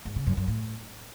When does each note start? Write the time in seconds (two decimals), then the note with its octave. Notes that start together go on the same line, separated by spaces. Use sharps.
0.05 G#2
0.16 C#3
0.26 F#2
0.37 F#2
0.48 A2